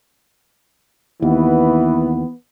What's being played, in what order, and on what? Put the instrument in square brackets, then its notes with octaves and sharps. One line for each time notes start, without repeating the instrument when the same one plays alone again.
[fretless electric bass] D#2 [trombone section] E3 B3